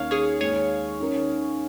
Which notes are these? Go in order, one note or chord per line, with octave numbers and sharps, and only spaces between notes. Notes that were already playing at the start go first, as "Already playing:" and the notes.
Already playing: D#2 D#3 C#4 A#4 C#5 F5
G#4 C#5
D#2 D#3 G#3 G#4 C#5
D#3 C#4 A#4